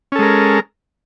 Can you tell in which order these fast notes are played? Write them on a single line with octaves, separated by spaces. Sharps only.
C#4 A4 G#3 A#4